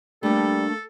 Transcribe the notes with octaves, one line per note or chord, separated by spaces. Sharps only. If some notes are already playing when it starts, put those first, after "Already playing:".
G3 A3 A#3 D4 A4